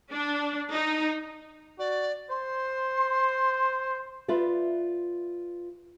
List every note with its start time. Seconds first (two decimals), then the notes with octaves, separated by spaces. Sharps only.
0.12 D4
0.73 D#4
1.79 F#4 D5
2.30 C5 C6
4.28 F4 B4 D5 E5